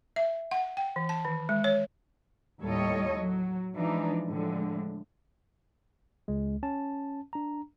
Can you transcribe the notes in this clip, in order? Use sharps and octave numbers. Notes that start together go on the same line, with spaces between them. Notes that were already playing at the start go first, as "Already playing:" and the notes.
E5
F#5
G5
E3
A5
D#3
G#3
C#5
D#2 A2 G3 A4 C#5 D#5
F#3
E3 F3 G#3 D4 D#4
A2 D3 F3 G#3
C#2 G#3
C#4 A5
D4 A#5